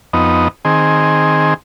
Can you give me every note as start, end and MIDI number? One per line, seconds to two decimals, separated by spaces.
0.13 0.48 41
0.13 0.48 59
0.13 0.48 63
0.65 1.54 51
0.65 1.54 60
0.65 1.54 68